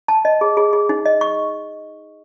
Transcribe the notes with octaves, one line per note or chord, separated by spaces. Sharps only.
A5
D#5
G#4
G#4
G#4
D#4
D#5
C#6